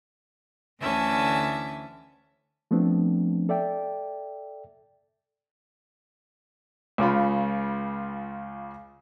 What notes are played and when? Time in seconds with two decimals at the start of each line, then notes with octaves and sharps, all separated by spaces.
0.81 D2 D3 E3 C#4 E5 A5
2.71 F3 A3 B3 C4 D4
3.49 A4 D5 E5 G5
6.98 C#2 C#3 F4 B5